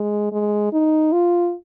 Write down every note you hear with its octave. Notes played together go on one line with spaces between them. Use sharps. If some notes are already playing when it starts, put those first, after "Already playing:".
Already playing: G#3
G#3
D#4
F4